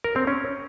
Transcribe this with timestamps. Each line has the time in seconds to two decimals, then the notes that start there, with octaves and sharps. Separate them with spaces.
0.04 A#4
0.16 C4
0.27 C#4